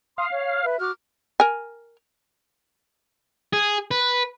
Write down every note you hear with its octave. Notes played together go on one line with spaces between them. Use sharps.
F5 C6 D#6
C#5
B4 E5
F#4 D6 F6
A#4 G#5
G#4
B4